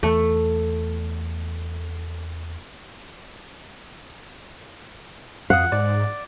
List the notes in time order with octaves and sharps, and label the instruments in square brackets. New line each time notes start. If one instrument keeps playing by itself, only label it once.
[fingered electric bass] E2 [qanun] A3
[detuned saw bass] F2 [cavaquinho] F5 D#6 [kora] F#5
[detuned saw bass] G#2 [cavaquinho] D5